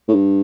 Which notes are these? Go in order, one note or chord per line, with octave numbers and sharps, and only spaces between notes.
A2
G2